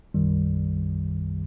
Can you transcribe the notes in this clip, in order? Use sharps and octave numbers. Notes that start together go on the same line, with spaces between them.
B1 F#2 D#3 G3